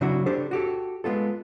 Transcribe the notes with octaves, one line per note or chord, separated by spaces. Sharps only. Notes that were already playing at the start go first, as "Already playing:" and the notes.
C#3 F#3 D4 E4 F#4
D4 G4 A4 C5
F#4 G4 A4
G#3 B3 F4 A4